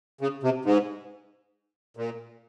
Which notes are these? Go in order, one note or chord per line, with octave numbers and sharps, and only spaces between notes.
C#3
C3
G#2
A#2